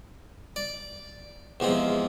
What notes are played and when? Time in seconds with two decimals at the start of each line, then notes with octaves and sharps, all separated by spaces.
0.56 D5
1.60 E2 C3 F3 G#3